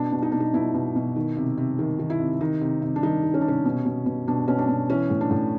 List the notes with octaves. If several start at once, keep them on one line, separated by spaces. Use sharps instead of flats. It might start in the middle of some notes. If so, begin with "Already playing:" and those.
Already playing: B2 D4
B2
D#4
B2 D4
D#4
B2 E4
B2
B2
D#3
C3
C3
D#3
D#3
E4
C3
D#3 D#4
C3
C3
D4
D#3 D#4
D#3
C#4
D4
C3 C#4
B2
B2
B2
B2 D4
B2 C#4
D4
B2
E3 C#4
A2
D4
A2